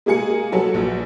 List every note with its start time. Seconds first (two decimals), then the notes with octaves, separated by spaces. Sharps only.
0.06 G#3 A#3 G#4 G#5 C#7
0.52 F#3 F#4 A4 B4
0.74 A#1